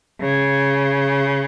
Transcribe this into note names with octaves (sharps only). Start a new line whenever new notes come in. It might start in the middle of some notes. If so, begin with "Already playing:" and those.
C#3